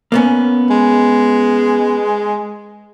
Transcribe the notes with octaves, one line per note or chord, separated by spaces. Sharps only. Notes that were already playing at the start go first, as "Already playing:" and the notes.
A#3 B3 C#4
G#3